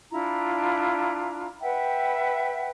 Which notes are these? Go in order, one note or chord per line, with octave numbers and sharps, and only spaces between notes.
D4 E4 F4 A#5
B4 E5 F#5 G5